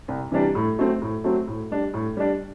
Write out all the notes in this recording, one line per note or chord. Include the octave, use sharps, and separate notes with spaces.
C2
C3 E3 G3 D4
A2
F#3 A3 C4
A2
F#3 A3 C4
A2
G3 D4
A2
G3 D4